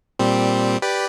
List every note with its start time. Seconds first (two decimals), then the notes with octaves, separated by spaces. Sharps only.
0.19 A#2 G3 C4
0.82 G4 B4 D5